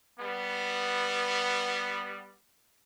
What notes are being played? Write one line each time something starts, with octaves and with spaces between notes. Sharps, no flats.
G3 B3